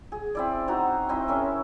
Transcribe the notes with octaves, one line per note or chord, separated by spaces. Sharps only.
G#4
C4 E4 D5
D#4 F#4 C5 A#5
C4 E4 D#5 B5
C#4 A#4 E5